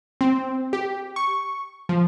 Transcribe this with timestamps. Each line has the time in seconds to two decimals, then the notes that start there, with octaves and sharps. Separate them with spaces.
0.21 C4
0.73 G4
1.16 C#6
1.89 F3